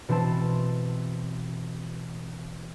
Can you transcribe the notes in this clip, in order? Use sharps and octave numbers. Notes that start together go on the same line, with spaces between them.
B2 E3 C4 E4 A5